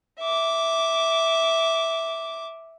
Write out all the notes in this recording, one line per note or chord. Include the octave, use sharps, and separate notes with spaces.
E5 D6